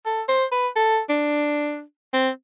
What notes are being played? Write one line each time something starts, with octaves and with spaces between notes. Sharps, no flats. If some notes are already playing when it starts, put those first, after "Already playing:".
A4
C5
B4
A4
D4
C4